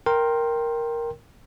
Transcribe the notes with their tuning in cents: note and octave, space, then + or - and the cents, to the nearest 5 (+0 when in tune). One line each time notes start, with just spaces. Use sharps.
A#4 +0 G5 +0 C6 +15